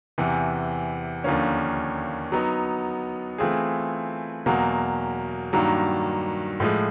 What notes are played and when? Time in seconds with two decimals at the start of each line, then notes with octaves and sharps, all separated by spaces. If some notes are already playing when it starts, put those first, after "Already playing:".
0.18 E2 C3 E3
1.24 D#2 D3 F3 A#3 C#4
2.32 F#3 B3 D#4
3.38 E3 A3 C4 F4 G#4
4.46 E2 B2 F#3 A#3
5.53 G2 D#3 F#3 A#3
6.60 A2 F3 G#3